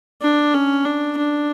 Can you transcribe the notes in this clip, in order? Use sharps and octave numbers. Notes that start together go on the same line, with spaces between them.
D4
C#4
D4
D4